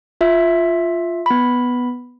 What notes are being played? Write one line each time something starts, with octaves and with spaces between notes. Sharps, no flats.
F4 E5
B3 B5